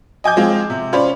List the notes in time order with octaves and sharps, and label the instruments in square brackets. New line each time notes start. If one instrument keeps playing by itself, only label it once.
[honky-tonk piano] D#5 G#5 D6 G6
F3 G#3 C4 F4 G#4
C3
C#4 F4 C5 D5 B5